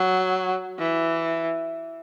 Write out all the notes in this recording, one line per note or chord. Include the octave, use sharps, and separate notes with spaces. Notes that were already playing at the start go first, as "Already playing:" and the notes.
Already playing: F#3
E3